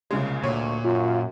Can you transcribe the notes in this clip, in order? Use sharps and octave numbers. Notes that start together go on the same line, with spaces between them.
C2 A#2 C#3 G#3
D2 A#2 C#5
F#2 F4